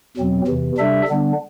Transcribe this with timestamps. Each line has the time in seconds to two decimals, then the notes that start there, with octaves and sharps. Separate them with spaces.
0.17 E2 B2 F#3 C4
0.47 E2 C3 E3
0.77 C3 G3 D4 A4 E5
1.08 D3 G3 B3 D4